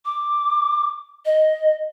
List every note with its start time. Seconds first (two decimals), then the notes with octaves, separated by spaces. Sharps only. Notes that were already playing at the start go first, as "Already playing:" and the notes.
0.05 D6
1.26 D#5